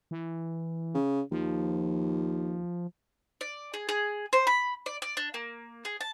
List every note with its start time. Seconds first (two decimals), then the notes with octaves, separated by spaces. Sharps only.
0.11 E3
0.95 C#3
1.32 D#2 F3
3.41 D5
3.74 G#4
3.89 G#4
4.33 C5
4.47 B5
4.86 D5
5.02 D5
5.17 D4
5.34 A#3
5.85 G#4
6.01 A5